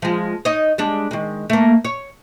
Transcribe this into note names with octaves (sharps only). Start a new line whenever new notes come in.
F3 G#3
D#4 C#5 D#5
G3 G#3 D4
D#3 G#3
A3 A#3
C#5